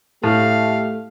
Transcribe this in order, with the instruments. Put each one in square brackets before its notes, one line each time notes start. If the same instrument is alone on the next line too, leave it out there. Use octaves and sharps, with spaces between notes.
[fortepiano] A2 [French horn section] A3 G4 [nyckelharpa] F5